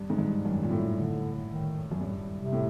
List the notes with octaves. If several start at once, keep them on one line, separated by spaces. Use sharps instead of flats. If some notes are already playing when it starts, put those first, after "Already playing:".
Already playing: G2
G#2
G2
F#2 D#3
A#2
A2
D3
D#3
F#2
G2
C3
A2